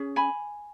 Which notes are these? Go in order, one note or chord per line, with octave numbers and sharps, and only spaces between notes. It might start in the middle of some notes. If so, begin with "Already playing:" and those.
Already playing: C#4 G#4
G#5 B5